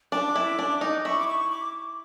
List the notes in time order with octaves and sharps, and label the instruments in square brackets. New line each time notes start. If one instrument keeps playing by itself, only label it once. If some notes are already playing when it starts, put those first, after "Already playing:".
[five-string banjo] D4 [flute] D6
[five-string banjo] E4
D4
D#4
[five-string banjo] E4 [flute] C#6
[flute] D6
C#6
D6